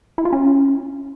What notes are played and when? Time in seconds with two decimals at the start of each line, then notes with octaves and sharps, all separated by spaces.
0.18 E4
0.25 F4
0.33 C#4